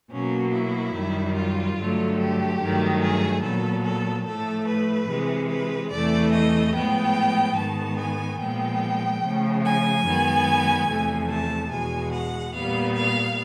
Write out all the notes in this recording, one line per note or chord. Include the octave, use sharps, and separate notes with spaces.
B2 F#3 A#3 C#4
E4
F#2 D#3 G3
F4
G2 D3 F#3 A3
G4
G2 D#3 F#3 A3
G#4
A#2 F#3 B3 A4
A4
A2 F3 A3 A4
B4
C3 E3 G#3
B4
E2 C3 E3 A3 D5
D#5
A2 F3 G#3 B3 G5
G#2 D#3 G#3 B3 A5
G#5
A#2 F3 G#3 B3 G5
C#3 F3 A3
G#5
F#2 D#3 G#3 B3
E2 C3 F3 A3
A5
E2 B2 G#3 G#5
F#5
A#2 G3 B3 F5
F5